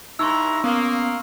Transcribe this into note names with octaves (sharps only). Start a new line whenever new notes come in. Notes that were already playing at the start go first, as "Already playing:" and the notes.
G2 D#4 E4 A#5 C6 C#6 E6
A#3 B3 C#4 D#6